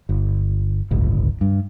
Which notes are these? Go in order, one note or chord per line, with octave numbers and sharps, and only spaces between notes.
G1
D1 G1 C#2
G2